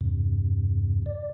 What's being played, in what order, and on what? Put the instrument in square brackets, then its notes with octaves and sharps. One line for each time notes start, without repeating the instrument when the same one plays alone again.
[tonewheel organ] E2 G2 C3
D5